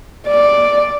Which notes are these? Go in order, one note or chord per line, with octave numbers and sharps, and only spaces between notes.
D5